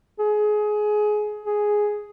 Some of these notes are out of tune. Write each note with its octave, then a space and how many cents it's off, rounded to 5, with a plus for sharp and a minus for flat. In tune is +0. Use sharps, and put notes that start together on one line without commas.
G#4 +20
G#4 +5